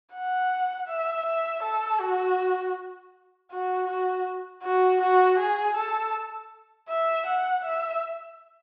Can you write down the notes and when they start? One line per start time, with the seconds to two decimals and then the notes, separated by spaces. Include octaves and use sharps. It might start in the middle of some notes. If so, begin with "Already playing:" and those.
0.14 F#5
0.88 E5
1.26 E5
1.63 A4
2.00 F#4
3.52 F#4
3.88 F#4
4.63 F#4
5.02 F#4
5.39 G#4
5.77 A4
6.89 E5
7.27 F#5
7.65 E5